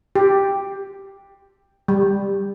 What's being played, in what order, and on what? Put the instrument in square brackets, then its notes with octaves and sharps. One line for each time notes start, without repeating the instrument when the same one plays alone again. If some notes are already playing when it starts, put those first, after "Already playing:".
[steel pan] G4
G3